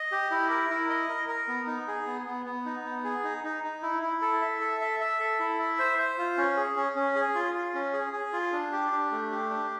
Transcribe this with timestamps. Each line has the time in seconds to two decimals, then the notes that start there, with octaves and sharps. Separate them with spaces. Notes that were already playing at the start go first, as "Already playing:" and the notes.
Already playing: D#5
0.12 G4
0.31 E4
0.50 A#4
0.70 E4
0.89 D#5
1.09 A#4
1.28 A#4
1.48 B3
1.67 D#4
1.88 G#4
2.07 B3
2.27 B3
2.46 B3
2.65 D#4
2.85 B3
3.04 G#4
3.24 D#4
3.44 D#4
3.64 D#4
3.83 E4
4.03 E4
4.22 A4
4.42 E5
4.61 A4
4.81 E5
5.00 E5
5.20 A4
5.39 E4
5.59 E5
5.79 C5
5.98 C5
6.18 F4
6.37 C#4
6.57 G#4
6.76 C#4
6.96 C#4
7.15 G#4
7.35 F4
7.54 F4
7.74 C#4
7.93 G#4
8.13 G#4
8.33 F4
8.53 D4
8.72 G4
8.92 D4
9.11 A3
9.31 G4
9.50 D4